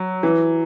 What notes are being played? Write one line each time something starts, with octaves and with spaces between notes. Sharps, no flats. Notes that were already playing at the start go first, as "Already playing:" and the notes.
Already playing: F#3
E3